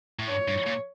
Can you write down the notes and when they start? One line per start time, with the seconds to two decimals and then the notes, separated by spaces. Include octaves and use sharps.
0.19 A2
0.29 G2 C#5
0.48 G2
0.66 A#2